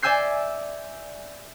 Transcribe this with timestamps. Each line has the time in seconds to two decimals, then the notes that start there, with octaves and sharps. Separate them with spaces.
0.02 D5 E5 G#5 E6 G6 C7